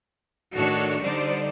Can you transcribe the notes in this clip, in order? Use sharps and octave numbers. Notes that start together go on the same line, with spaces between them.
A2 D#3 D4 F#4 A4 C#5
D3 G3 D#4 C5 D5